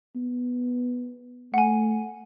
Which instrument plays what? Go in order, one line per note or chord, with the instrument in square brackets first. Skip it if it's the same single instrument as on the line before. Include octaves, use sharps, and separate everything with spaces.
[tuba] B3
[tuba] A3 [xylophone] F#5 G#5